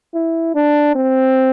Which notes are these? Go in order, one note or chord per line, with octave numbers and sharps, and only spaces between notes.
E4
D4
C4